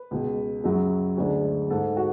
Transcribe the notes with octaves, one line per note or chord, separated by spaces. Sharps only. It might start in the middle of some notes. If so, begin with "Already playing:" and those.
Already playing: B4
C#2 B2 G#3
F#2 C#3 F#3
D2 D3 G#3
G#2 G#3 A4
F#4